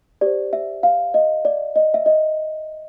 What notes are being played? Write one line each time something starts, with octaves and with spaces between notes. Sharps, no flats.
G4 C5 D5
E5
F5
D#5
D5
D#5
E5
D#5